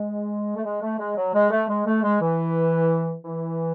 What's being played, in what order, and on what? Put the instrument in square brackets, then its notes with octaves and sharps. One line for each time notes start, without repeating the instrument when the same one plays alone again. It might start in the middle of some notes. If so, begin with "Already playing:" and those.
Already playing: [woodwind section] G#3
A3
G#3
A3
G#3
F#3
G#3
A3
G#3
A3
G#3
E3
E3